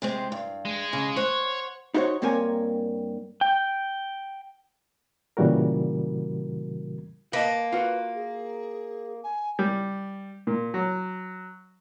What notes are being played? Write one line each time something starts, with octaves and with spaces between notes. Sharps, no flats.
C3 G#3 C4
G2
G#3
C#3
C5 C#5 F#5
D#4 E4 F#4 C5 C#5
G2 A#3 C4 A#4 C#5 G#5
G5
A#2 C#3 E3 G3 F#4 A#4
A#3 B4 D#5 A5
F4 F#4 B4
G#4
G#5
G3
A#2
F#3